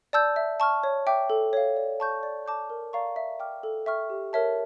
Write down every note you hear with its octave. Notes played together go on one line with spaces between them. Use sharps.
D5 A5 E6 G6
E5
A5 C#6 F6
C#5
E5 G5 D6 G6
A4
C#5 F5
D5
A5 C#6 G6
D5
A5 D6 G6
A#4
D5 F5 A#5 C#6
E5
G5 D6 F6
A4
E5 G5 C#6 F6
G4
A#4 C#5 E5 A5